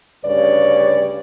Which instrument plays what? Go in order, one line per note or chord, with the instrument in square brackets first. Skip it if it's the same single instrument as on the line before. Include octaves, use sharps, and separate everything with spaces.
[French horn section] D2 G2 C#3 B4 C#5 D5